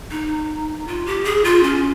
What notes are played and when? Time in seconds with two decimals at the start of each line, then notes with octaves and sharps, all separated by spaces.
0.11 D#4
0.87 F4
1.06 G4
1.24 G#4
1.44 F4
1.63 C#4